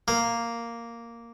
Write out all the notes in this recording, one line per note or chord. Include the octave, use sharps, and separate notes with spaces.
A#3